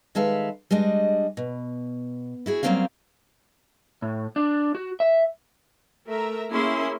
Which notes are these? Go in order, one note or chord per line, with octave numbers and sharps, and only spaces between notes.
D#3 G#3 A4 B4 E5 F5
G3 G#3 D4 D#5
B2
E4 F#4 G#4
F#3 G3 A#3 C4 C#4 F5
A2
D4
F#4
E5
A3 A#4 E5 A#5
A#3 C#4 E4 G#4 C6